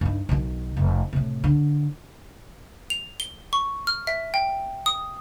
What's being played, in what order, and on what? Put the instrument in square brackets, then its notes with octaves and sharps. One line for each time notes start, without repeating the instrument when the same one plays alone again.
[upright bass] G2 D#4
B1 D#3
F1
A2 C3
D3
[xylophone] F7
G7
C#6
F6
E5
G5
D#6